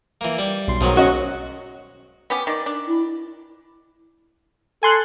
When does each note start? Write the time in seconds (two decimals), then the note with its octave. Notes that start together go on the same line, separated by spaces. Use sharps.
0.21 E3 A#3
0.38 G3
0.68 B1 C6
0.81 B1 G#2 D#3 F#3
0.97 C#4 F#4 D#5
2.30 B3 C#4 G4
2.47 D#3 D5
2.66 D4
2.87 E4
4.83 A4 G#5 C6 F#6